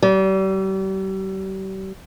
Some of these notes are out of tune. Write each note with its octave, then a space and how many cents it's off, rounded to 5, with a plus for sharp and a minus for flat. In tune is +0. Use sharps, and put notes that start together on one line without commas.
G3 -40